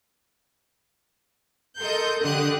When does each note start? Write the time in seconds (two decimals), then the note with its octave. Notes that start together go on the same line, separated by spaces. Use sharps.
1.79 A4 A#4 D#5 C6 G6
2.22 D3 G4 D#6 F#6